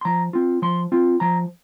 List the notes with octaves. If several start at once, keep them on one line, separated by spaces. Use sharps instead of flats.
C6
F3 A#5
C4 F4
F3 C6
C4 F4
F3 A#5